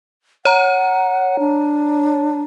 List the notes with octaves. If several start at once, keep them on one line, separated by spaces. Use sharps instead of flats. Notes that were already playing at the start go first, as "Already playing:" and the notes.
C#5 F#5 A#5
D4